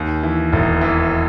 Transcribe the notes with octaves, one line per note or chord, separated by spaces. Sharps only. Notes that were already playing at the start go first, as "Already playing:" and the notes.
Already playing: D#2
E3
E1
E3